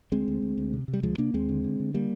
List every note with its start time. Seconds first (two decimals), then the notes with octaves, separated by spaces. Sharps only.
0.12 D2 G#3 C4
0.28 D2
0.42 D2
0.58 D2
0.73 C3
0.88 C3
0.93 G3
1.03 D2 F3 G#3
1.18 C3 A#3 D4
1.34 D#2 G#3 C4
1.49 D3
1.64 D3
1.80 D3
1.94 G3 A#3